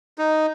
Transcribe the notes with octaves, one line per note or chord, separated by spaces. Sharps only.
D#4